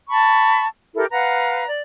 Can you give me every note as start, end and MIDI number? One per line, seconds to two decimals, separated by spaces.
0.09 0.65 81
0.09 0.65 83
0.09 0.65 85
0.96 1.06 64
0.96 1.06 67
0.96 1.06 69
0.96 1.06 70
1.12 1.66 71
1.12 1.66 77
1.12 1.66 78
1.12 1.66 82
1.67 1.80 74